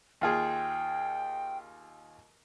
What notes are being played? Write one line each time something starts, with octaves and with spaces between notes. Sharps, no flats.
D#2 F4 G#4 G5